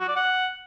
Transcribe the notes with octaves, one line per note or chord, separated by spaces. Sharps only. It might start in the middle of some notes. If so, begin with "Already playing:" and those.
F#4
D5
F#5